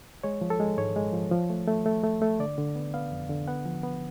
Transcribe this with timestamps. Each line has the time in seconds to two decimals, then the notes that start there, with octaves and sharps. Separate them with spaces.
0.24 G#3 C#5
0.41 F3
0.50 A4
0.60 G#3
0.78 G#2 C#5
0.96 G#3
1.13 F3
1.31 F3
1.50 A3
1.68 A3
1.86 A3
2.03 A3
2.22 A3
2.39 D3 D5
2.58 D3
2.75 B3
2.94 B3 F5
3.12 F2
3.29 D3
3.48 B3 F#5
3.66 F3
3.83 B3